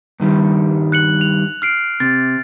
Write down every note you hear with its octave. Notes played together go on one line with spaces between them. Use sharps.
G2 D#3 G3
F#6 C#7 F#7
F7
F6 C7 D7
C3 A6